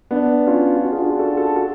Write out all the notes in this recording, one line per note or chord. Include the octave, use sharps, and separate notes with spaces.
B3 D4
C#4 F4
F4
D4 F#4
F4 G#4
D4 F#4
F4 G#4
F#4 A4
F#4 A4
F#4 A4